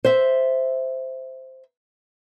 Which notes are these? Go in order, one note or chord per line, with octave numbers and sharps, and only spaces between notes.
C5 E5